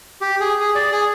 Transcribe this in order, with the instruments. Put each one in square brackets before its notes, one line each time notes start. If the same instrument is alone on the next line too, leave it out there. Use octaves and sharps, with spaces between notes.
[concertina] G4
G#4
G#4
D5
G#4